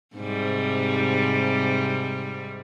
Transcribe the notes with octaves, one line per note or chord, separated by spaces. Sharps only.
G#2 C3 G3